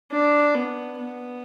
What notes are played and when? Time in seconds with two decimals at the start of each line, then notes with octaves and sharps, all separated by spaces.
0.12 D4
0.55 B3
0.98 B3